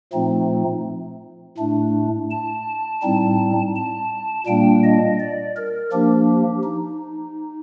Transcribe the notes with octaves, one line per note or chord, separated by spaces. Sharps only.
A#2 F3 A3 C4 D#4
A2 A3 D4
A5
A2 G3 C4 D#4
A5
A#2 G3 A#3 D4 G5
D#5
D5
A#4
F3 A#3 D4 G4
D#4